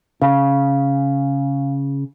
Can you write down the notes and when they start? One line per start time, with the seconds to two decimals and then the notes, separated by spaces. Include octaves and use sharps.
0.22 C#3 F5